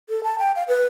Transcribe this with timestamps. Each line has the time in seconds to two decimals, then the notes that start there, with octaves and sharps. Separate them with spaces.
0.09 A4
0.24 A5
0.39 G5
0.56 F5
0.68 B4